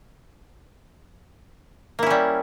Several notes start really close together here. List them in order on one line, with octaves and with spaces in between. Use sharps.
A#3 E4 C#4 G3